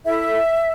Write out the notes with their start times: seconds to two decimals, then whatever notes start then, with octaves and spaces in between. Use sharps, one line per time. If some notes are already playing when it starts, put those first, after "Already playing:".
0.05 E4 A4 E5